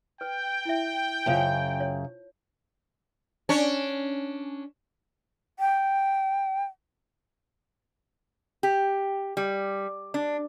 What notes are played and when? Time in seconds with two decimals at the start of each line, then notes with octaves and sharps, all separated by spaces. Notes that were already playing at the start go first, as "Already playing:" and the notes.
0.21 B4 G5
0.65 E4 E5
1.26 F#2 C#3 F4 C5 A5
1.80 C#5
3.49 C#4 D4 C#5
5.59 G5
8.63 G4
9.37 G3
10.14 D4